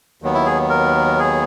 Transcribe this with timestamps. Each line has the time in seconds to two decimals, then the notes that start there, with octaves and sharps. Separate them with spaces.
0.22 D#2 D#3 F#3 B3
0.35 E4
0.46 G#4
0.70 A#4
1.19 G#4